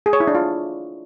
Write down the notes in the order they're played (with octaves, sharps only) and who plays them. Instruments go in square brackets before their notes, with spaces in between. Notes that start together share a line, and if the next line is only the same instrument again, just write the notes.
[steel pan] G#4
C#5
E4
D4
F4